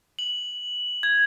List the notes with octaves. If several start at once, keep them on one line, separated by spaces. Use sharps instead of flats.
F#7
G#6